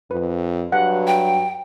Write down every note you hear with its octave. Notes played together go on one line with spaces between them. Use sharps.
F2 B4
G2 F#3 F#5
G5